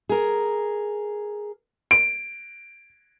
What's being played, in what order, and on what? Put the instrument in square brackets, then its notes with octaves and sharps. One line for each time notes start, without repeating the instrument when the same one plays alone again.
[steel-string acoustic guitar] G#4 A#4
[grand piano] D7